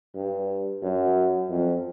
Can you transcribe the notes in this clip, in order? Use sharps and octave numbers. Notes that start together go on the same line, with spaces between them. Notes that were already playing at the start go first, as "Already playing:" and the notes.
G2
F#2
F2